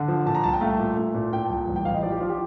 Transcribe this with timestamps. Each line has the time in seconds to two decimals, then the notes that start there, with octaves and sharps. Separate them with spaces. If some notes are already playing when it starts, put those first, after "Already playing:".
Already playing: D3
0.08 F3
0.26 A#2 A5
0.35 A#5
0.44 C2 A5
0.53 G5
0.61 A3 F5
0.79 A#2
0.97 A3
1.14 A#2
1.33 A#2 G5
1.44 A5
1.49 C2
1.68 A1
1.76 G5
1.85 A1 F5
1.94 D#5
2.03 F3 D5
2.12 G4
2.21 F3 F4
2.30 G4